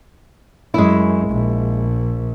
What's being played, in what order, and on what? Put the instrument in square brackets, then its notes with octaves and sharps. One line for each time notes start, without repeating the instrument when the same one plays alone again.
[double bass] F#2 [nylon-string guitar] G#3 E4
[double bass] A#1